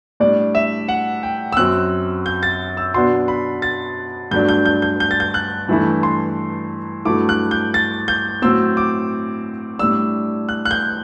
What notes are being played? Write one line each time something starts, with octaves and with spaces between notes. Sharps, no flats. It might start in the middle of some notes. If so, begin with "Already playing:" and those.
A2 G3 D4 D5
E5
F#5
G5
E6
F#2 F#3 C4 F#6
G6
A6
E6
B2 F#3 B3 D4 C6
B5
A6
G2 F#3 A3 D4 G6
G6
G6
G6
G6
A6
G6
F#6
G2 E3 A3 E4
C6
G2 F#3 A3 E4 D6
F#6
G6
A6
G6
A2 F#3 C4 E6
D6
A2 G3 D4 E6
F#6
F#6
G6